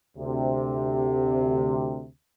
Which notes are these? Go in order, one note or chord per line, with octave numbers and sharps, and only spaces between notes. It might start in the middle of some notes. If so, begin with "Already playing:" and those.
D2 C3